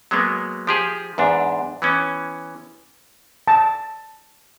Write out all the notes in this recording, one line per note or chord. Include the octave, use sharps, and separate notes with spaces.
F#3 G#3 A#3 B3
F3 G4 G#4
E2 G#2 D4
E3 B3 C#4
A5